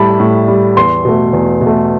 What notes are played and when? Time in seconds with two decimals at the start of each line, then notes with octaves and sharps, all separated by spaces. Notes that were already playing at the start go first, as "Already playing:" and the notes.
Already playing: A2 G3 A5 B5
0.20 A2
0.48 G3
0.77 E2 C6
1.05 B2 A3
1.33 E2
1.61 B2
1.67 A3